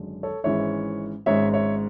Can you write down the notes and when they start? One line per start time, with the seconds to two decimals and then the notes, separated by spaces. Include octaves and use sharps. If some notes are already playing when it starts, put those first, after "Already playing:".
Already playing: G#1 F#2 D3 G#3
0.23 A4 C#5
0.44 G#1 G#2 E3 G#3 C#4 C#5 E5
1.26 G#1 G#2 G#3 C#4 C#5 E5
1.54 C#5 E5